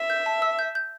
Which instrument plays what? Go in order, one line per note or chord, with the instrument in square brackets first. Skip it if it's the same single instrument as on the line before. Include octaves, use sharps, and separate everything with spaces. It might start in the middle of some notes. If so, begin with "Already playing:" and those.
Already playing: [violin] E5
[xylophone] G6
A5
E6
G6
G6